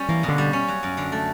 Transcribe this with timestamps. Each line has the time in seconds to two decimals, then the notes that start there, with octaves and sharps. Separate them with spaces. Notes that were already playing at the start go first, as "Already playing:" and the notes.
Already playing: G3 C#4
0.09 E3 A#3
0.23 B2
0.28 D3
0.38 G3
0.53 C#4
0.68 F#3
0.83 F#2
0.97 D3
1.12 A3